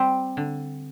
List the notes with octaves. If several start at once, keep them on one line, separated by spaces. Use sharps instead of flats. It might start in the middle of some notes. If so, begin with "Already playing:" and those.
Already playing: G3 C4
D3